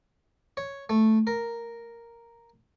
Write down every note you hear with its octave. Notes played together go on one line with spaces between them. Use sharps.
C#5
A3
A#4